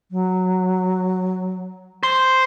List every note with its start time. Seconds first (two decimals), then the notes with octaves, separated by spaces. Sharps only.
0.11 F#3
2.03 C5